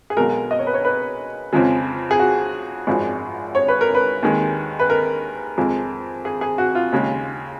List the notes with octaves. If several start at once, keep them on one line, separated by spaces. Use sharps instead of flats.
G#4
B1 B2 G#3 A#4
D#5
C#5
B4
C#5
B4
F2 C#3 F3 G#3
G#4
F#4
G#1 F#2 F3 G#3
C#5
B4
A#4
B4
D#2 D#3 G#3
B4
A#4
F2 F3 G#3
G#4
G#4
F#4
F4
D#2 C#3 G#3